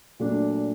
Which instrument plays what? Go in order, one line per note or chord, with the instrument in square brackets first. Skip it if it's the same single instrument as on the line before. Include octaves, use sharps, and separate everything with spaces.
[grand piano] A#2 F#3 A3 D4